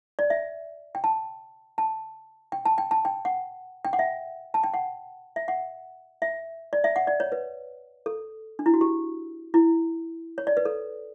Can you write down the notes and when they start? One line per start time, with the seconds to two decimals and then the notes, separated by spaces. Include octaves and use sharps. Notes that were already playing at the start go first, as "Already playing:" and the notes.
0.19 D5
0.30 E5
0.95 G5
1.04 A5
1.78 A5
2.52 G5
2.65 A5
2.78 G5
2.91 A5
3.05 G5
3.25 F#5
3.85 G5
3.93 F#5
3.99 E5
4.54 A5
4.64 G5
4.74 F#5
5.36 E5
5.48 F#5
6.22 E5
6.73 D5
6.84 E5
6.96 F#5
7.07 D5
7.20 C#5
7.32 B4
8.06 A4
8.59 D4
8.66 E4
8.74 F#4
8.81 G4
9.54 E4
10.38 C#5
10.47 D5
10.57 B4
10.65 A4